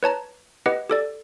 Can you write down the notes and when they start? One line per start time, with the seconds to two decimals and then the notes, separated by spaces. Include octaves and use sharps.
0.03 B4 C#5 A5 A#5
0.66 G4 B4 D#5 F#5
0.90 G4 A4 D5